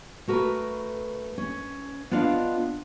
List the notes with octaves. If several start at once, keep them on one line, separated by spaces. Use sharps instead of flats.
A3 F#4 A#4 B4
C#4
B3 D4 F4 D5 D#5 F5